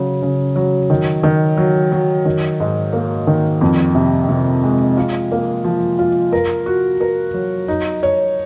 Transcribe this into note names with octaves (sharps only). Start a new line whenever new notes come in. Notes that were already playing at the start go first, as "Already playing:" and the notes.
Already playing: C#3 F#3
C#3
F#3
D#3
D#3
F#3
F#3
D#3
G#2
A#3
D#3
F2
C3
C3
G#3
F4
A#3
F3
F4
A#4
F#4
A#4
F#3
D#4
C#5